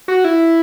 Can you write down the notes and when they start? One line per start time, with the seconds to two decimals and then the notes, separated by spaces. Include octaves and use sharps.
0.08 F#4
0.24 E4